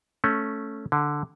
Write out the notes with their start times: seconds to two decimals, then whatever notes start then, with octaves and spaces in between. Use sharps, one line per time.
0.24 A3 C#4
0.92 D3